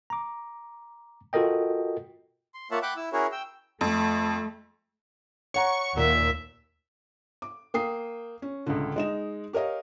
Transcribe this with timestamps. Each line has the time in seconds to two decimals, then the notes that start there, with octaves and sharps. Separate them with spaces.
0.10 A#5 D6
1.33 F4 F#4 A4 A#4 D#5 G5
2.54 C6
2.71 A#3 F4 C#5 E5 F#5 A5
2.82 F#5 G5 B5 D6 F#6
2.96 E4 E6
3.13 C#4 E4 F#4 G#4 A#4 C#5
3.32 G5 E6
3.81 F2 A3
5.54 C#5 F#5 A#5 C#6
5.97 D#2 A#2 E5
7.42 D6
7.74 A#3 G5 D#6 C7
8.42 C#4
8.66 C#2 A2 D3
8.96 G#3 D#4 E7
9.53 G4 A#4 C#5 D#5 F5